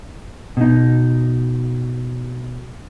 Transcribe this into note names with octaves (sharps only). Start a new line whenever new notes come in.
B2 D#4